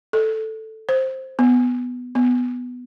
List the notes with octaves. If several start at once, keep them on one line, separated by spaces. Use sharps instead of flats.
A4
C5
B3
B3